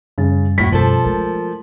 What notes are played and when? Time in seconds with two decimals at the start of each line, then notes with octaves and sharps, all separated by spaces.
0.18 F#2 C#3 G3 A6
0.58 D#2 A2 F#4 B6
0.72 B2 F3 C#4 A4
1.05 G#3 A3 A#4